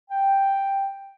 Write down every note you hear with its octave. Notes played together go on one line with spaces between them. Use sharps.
G5